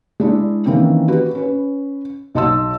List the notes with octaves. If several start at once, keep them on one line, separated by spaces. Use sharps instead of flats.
G#3 D4 E4
D#3 E3 A#3 C4 C#4
F#4 G4 B4
C#4 B4
B1 D#5 A5 C6 E6